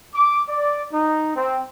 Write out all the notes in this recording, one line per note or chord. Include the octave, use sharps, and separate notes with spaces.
D6
D5
D#4
C4